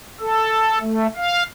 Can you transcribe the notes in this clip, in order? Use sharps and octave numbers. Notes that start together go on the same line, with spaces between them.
A4
A3
F5